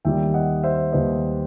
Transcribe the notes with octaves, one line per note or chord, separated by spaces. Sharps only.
D#2 D#3 G3 E5 G5
D#5 F#5
C5 E5
D#2 D#3 G3 B4 D#5